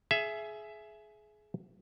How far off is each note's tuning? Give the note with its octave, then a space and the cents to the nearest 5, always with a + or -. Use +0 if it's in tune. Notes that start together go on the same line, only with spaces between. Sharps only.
G#4 +25 E5 +10